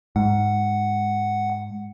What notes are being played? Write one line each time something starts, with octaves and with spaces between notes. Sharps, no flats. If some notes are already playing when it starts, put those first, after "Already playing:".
G#2 F#5